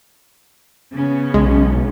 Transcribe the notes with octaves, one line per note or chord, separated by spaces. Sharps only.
C#3 B3 C#4
B1 G#3